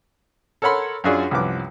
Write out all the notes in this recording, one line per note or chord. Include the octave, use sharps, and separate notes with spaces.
A4 A#4 C#5 F#5 B5 C6
F#2 D4 F4 F#4 G#4 D5
C2 F#2 F3 B4 D6